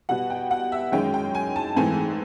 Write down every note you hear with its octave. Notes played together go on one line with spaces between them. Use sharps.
B2 G3 B3 F#5
G5
F#5
E5
F#2 D#3 G#3 C#4 G5
G5
G#5
A5
G#2 E3 A3 C4 G#5